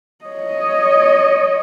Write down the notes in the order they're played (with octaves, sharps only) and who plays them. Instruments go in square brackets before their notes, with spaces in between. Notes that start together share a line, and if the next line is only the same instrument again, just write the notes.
[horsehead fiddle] C#5 D#5